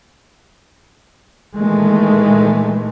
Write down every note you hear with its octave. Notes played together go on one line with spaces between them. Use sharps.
A#2 D#3 E3 G#3 A3